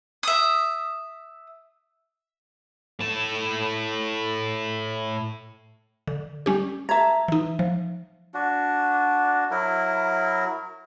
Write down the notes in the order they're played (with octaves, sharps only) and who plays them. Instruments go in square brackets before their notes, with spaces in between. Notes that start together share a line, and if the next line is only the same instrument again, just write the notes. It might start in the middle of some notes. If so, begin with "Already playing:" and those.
[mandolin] E5 D#6
[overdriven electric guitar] A2 A5
[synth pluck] D3
G3 C#4 G4
[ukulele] E5 A#5 [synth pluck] A5 G#6
[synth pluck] E3 D#4
F3
[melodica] D4 F#4
F#3 E4 A#4